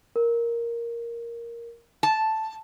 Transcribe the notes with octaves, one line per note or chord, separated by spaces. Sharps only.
A#4
A5